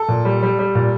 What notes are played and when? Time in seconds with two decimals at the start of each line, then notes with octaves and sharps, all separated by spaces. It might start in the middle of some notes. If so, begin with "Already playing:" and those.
Already playing: A4
0.09 A#2
0.25 G3
0.43 G3
0.59 G3
0.75 A#2